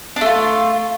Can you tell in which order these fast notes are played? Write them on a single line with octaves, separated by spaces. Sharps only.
D4 A3 F4